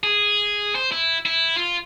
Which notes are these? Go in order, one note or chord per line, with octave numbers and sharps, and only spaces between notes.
G#4
C5
E4
E4
F4